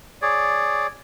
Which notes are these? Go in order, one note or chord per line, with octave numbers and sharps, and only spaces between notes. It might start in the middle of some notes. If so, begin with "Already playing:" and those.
G#4 C#5 D5